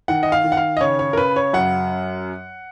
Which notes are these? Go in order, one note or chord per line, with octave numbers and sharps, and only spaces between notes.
D#3 F#5
D#5
F5
D#3
F#5
F5
D#5
C#3 C#5
C#5
A#4
C#3 B4
C#5
F#2 F#5